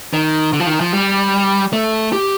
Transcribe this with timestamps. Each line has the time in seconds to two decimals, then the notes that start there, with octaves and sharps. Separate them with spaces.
0.14 D#3
0.53 D3
0.60 F3
0.67 D#3
0.80 F3
0.93 G3
1.73 A3
2.13 G4